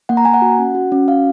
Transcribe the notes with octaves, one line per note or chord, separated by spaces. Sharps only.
A#3 F#5
A#5
A#3 G#5
F#5
F#4
C#4
F#4
C#4
F#4 F5